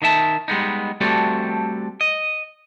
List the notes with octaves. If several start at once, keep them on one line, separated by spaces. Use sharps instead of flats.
D#3 D#4 E5 A5
G3 G#3 B3 D#4
G3 A3 C4 F#4 G4 A4
D#5